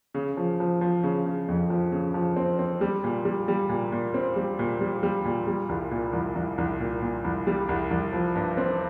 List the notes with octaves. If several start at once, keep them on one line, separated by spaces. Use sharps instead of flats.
C#3
F3
F3
F3
C#3
C#3
F2
F3
C#3
F3
C4
C4
G3
A#2
G3
G3
A#2
A#2
C4
G3
A#2
G3
G3
A#2
G3
C2
A#2
C2
C2
C2
A#2
A#2
C2
G3
C2
C2
F3
G2
C4